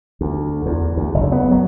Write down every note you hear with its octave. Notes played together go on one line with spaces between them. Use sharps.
D2
E2
D2
F#1
B3
F#3